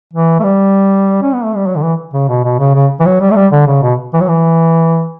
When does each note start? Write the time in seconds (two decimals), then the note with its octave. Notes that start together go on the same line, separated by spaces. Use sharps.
0.13 E3
0.39 A3
0.43 G3
1.22 C#4
1.34 B3
1.44 A3
1.56 G3
1.67 F#3
1.76 D3
1.82 E3
2.13 C#3
2.29 B2
2.44 B2
2.60 C#3
2.75 C#3
3.00 E3
3.05 F#3
3.21 G3
3.31 A3
3.36 G3
3.52 D3
3.67 C#3
3.82 B2
4.14 E3
4.20 F#3
4.28 E3